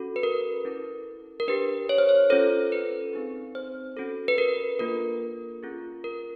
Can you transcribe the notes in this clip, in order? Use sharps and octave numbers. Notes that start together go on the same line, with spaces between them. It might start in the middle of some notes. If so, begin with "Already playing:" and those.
Already playing: C#4 F#4 A4
B4
A#4
C#4 E4 A4
A#4
D4 G4 B4
C#5
C5
C#5
C#4 F4 A4 C5
B4
C4 D#4 G#4
C5
C#4 F#4 A4
B4
A#4
A#3 D4 F4 A4 A#4
C#4 F4 G#4
A#4